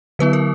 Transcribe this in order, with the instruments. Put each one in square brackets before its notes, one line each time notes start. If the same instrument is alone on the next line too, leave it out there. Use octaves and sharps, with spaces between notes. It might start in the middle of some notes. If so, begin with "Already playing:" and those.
[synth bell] D3 F#3 B3 E4 B4
A#4